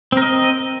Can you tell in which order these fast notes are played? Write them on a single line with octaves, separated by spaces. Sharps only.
C4 A#4 D#5